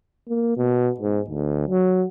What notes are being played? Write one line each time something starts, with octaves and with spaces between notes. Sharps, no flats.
A#3
B2
G#2
D2
F#3